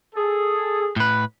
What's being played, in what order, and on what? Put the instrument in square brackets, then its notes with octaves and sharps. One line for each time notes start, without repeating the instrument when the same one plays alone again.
[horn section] G#4 A4
[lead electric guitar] A2 B4